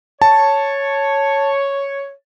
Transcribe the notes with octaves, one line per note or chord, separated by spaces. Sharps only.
C#5 A5